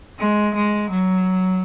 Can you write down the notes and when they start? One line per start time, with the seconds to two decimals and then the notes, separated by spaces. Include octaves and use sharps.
0.19 G#3
0.55 G#3
0.90 F#3